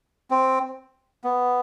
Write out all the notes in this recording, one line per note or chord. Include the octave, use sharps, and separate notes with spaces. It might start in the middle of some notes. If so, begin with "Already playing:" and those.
C4
B3